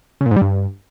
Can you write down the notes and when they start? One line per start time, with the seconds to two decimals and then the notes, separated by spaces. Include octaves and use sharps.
0.21 C#3
0.26 A#2
0.31 G#2
0.36 G3
0.42 G2